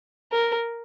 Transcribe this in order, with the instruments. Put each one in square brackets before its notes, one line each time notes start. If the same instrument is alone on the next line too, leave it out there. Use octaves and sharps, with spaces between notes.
[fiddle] A#4